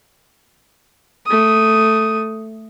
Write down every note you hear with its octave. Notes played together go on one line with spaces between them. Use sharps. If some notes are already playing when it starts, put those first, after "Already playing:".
A3 D#6